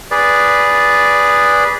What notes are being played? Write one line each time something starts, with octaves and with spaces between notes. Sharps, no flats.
G#4 B4 D5